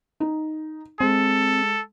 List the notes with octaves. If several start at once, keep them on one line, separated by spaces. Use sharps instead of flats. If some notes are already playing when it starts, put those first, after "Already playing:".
D#4
G#3 C4 A4